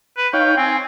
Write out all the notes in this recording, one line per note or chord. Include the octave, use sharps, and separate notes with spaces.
B4
D#4 C#5 F5 G5
C4 G#5